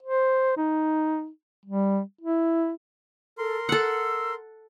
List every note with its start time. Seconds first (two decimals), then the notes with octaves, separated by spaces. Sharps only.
0.03 C5
0.57 D#4
1.66 G3
2.22 E4
3.38 A4 A#4 C6
3.69 A4 F#5 E6